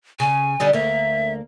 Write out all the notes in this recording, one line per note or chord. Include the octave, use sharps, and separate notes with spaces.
C#3 G#5
D3 G3 D#4
D2 A#3 E5